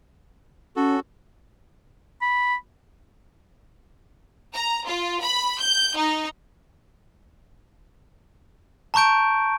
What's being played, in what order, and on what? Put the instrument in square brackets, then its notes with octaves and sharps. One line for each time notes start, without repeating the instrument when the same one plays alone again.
[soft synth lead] C#4 [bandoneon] F#4 A4
[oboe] B5
[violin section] A#5
F4
B5
G6
D#4
[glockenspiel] A5 A#5 C#6 G6 D7